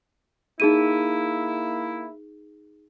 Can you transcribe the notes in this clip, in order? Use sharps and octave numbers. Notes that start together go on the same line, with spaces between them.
A#3 D#4 E4 G#4 D#7